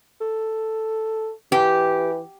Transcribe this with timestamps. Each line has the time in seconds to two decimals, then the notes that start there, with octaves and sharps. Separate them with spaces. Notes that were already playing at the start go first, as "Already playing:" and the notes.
0.21 A4
1.52 E3 G4